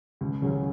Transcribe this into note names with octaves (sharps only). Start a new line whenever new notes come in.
C#2
C#3 F#3 C#4 G#4